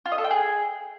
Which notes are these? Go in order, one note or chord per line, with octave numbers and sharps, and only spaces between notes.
F4
D#5
A4
G5
G#4